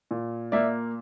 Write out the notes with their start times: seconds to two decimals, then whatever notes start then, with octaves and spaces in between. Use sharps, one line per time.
0.11 A#2
0.52 A#3 D5 E5